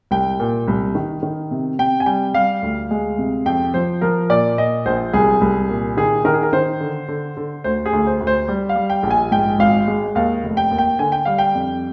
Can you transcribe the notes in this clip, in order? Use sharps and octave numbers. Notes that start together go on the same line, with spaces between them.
C2 G5
A#2
C2
D#3
D#3
C3
C3 G5
G#5
G3 G5
G3 F5
D2
G#3
C3
F2 G5
F3 C5
F3 A#4
A#2 D5
A#2 D#5
A#1 C5
C2 G#4
C2
A#2
D#3 G#4
D#3 A#4
G#4
A#4
D#3 C5
D3
D3
D3
D2 C5
G#4
D2
C5
D2
C5
G3
F5
G3
G5
A#1
G#5
G#2 G5
G#1 F5
G#3
D#2 F5
F1
G5
D#2
G5
D3 G#5
G5
G3 F5
G5
F2